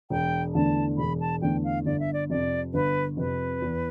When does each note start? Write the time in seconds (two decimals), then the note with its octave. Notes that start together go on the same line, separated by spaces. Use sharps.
0.10 E1 G5
0.54 E2 D3 A3 D4 A5
0.98 E1 B5
1.20 A5
1.42 E2 D3 A3 D4 G5
1.64 F5
1.85 G1 D5
2.00 E5
2.13 D5
2.30 F2 C3 D5
2.74 G1 B4
3.17 F2 C3 B4
3.62 E2